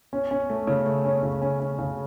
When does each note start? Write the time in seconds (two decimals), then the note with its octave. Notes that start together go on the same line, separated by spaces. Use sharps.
0.13 C#4
0.31 C#4
0.50 A3
0.67 C#3
0.86 A3
1.05 C#4
1.23 C#3
1.41 C#4
1.60 C#4
1.79 C#3